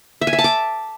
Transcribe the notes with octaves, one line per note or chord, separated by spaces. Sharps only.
E5
G#5
E5
A5
D6